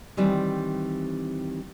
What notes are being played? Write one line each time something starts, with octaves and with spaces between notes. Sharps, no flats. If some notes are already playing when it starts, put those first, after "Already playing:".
D#3 E3 G3 C4